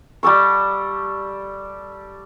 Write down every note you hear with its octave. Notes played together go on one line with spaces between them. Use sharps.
G3 G4 A4 C#6